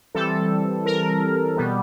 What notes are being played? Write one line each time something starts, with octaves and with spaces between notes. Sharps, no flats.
E3 G3 C4 A4
A#4
B2 G3 B3